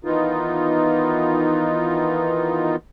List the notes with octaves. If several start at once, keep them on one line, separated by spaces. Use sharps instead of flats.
D#3 E3 B3 D#4 F4